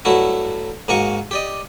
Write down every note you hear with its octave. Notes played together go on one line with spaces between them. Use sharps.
G2 F#3 A3 E4 F#4
G#2 A#3 F#4 G#5 C#6
G4 D5 D#5